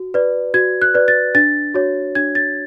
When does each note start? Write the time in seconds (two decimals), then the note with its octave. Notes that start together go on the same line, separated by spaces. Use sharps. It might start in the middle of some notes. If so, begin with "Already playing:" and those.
Already playing: F#4
0.14 B4 D5
0.54 F#4 G#6
0.82 F#6
0.94 B4 D5
1.08 A6
1.35 D4 A6
1.74 F#4 C#5
2.15 D4 G#6
2.35 A6